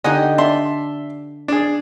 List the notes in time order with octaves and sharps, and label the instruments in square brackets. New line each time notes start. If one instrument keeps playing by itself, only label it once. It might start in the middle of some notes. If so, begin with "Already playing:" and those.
[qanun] D3 D#4 G4 [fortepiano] D#5 F#5 G#5
[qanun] D4 [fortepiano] E5 C6
[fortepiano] D4 G#4